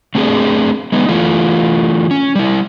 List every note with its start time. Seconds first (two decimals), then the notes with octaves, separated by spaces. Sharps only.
0.15 A3 C4 D4 G4 G#4
0.92 G#3 B3 D#4
1.09 E3 A3 F4
2.11 C#4
2.35 G3 E4